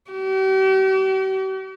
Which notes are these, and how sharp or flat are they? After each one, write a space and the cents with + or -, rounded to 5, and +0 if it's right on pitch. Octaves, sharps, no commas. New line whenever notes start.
G4 -45